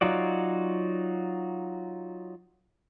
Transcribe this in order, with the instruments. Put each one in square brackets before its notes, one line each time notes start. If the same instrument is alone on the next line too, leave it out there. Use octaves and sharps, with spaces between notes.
[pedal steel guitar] F#3 D#4 F4 F#4 D5